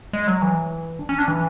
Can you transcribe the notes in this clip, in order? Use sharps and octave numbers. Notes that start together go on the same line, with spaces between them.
G#3
F#3
E3
D4
C#4
D4
E3